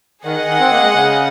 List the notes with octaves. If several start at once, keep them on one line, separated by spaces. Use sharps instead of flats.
D#3 G#4 D#5 F#5
D#3
C4
A#3
G#3
C#3